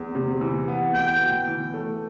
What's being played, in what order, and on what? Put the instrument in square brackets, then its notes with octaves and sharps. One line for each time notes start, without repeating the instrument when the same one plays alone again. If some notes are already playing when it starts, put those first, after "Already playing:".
Already playing: [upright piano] E2
C3
E3
B3
[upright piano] B1 [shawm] G5
[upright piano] B2
E3
A3